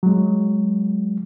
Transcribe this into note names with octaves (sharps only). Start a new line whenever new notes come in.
F#3 G#3